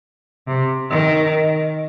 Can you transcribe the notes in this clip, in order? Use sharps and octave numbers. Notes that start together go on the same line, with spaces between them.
C3
D#3